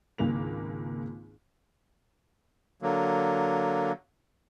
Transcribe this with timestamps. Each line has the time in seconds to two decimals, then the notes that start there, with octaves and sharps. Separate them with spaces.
0.18 G#1 C#2 A#3 F7
2.82 D3 F#3 A#3